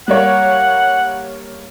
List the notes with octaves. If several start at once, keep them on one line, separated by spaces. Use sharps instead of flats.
G3 A#3 C#5 F#5